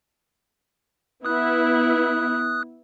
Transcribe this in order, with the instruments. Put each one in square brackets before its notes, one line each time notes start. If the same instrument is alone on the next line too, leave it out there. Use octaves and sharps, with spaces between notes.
[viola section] B3 E4 [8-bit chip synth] D#6 F#6